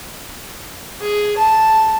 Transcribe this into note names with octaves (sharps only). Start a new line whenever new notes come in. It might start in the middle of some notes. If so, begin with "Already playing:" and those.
G#4
A5